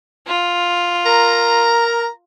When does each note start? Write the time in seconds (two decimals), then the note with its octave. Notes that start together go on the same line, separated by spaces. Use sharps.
0.27 F4
1.06 A#4 A#5